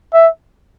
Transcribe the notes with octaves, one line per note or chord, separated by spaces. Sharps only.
E5